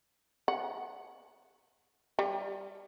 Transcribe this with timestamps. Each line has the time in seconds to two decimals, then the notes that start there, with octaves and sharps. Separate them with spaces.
0.48 F#5
2.19 G3